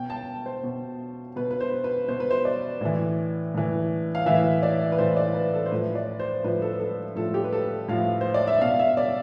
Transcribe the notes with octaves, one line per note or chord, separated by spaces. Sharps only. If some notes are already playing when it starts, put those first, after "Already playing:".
Already playing: B2 G5
A5
C5
B2
B2 B4
B4
C5
B4
B2 C5
B4
C5
D5
A2 E3
A2 E3
F5
A2 E3 E5
D5
B4
A2 E3 C5
D5
B4
A4
C5
A2 F3 B4
D5
C5
A2 F3 B4
A4
B4
A4
A2 F3 A4
G4
B4
A4
A2 F3 F5
C5
D5
E5
B2 F5
E5
D5